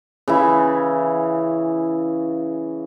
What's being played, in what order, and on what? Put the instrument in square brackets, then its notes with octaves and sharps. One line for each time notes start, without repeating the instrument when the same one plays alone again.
[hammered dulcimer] C#3 E3 E4